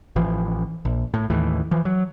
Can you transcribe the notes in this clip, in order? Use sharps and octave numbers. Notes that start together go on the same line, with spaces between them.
A1 E3 F3
A#1
A2
D#2 A2 E3
E3 F3
F#3